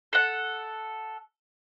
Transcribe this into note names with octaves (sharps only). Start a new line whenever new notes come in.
A4 F#5